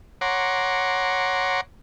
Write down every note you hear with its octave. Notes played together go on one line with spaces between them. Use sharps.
C#5 F#5 A#5 C6 D6